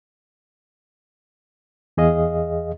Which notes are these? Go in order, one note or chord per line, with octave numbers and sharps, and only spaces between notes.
E2 G#4 D#5 F5